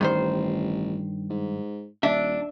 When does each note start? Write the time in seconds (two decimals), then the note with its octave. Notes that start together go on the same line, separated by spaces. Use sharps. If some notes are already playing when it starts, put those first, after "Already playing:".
0.01 A1 G2 D#3 C5
1.30 G#2
2.03 D#1 D4 E5